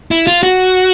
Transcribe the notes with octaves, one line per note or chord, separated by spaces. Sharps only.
E4
F4
F#4